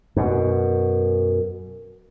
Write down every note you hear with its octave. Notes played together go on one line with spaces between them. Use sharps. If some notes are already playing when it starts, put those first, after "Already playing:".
F#2 B2